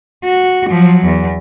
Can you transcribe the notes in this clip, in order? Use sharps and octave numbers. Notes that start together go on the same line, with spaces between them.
F#4
F3 F#3
E2